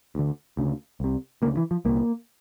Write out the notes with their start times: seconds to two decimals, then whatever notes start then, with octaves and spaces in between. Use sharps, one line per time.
0.15 D2 D3
0.57 D2 C#3
1.00 C2 C3
1.42 D2 C#3 A#3
1.57 E3
1.71 F3
1.85 C2 A#2 A#3